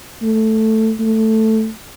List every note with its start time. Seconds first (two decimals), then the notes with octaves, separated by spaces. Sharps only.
0.23 A3
0.99 A3